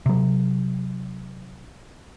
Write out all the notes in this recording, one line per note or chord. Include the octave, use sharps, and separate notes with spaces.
C3 F#3